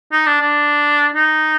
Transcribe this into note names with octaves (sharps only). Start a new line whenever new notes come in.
D#4
D4
D4
D#4